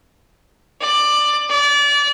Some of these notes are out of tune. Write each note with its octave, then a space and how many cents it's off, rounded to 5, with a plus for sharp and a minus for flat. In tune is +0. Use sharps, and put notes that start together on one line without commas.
D5 +15
D5 -30